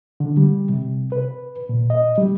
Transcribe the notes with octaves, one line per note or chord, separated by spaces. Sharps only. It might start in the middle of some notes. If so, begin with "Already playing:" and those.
D3
G3
C3
B4
A#2
D#5
G3